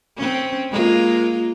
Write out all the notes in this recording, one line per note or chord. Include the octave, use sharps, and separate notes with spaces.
C4 C#4
G#3 A#3 F4